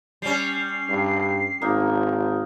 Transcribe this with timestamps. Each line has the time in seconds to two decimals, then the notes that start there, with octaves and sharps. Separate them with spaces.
0.22 G3 C#4 C7
0.89 G2
1.62 G#1 A#3 D#4